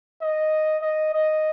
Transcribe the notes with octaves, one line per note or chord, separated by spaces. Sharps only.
D#5
D#5
D#5